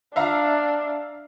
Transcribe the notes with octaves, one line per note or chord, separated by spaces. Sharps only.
D4 E5 F5 A#5